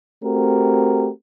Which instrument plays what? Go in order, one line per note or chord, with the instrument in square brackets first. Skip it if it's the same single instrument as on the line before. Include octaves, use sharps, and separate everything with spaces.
[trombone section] A3 C4 F#4 G4 A#4